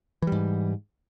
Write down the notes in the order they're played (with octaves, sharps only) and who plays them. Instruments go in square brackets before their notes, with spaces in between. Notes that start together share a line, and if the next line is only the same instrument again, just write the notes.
[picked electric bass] E3
G3
G#2